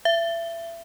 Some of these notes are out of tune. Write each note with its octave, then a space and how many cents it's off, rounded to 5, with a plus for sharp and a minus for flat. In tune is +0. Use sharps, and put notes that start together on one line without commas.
E5 +30